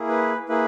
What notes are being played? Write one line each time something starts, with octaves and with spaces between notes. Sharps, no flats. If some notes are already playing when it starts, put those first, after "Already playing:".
Already playing: A#3 E4 G#4
B4
A#3 E4 G#4 B4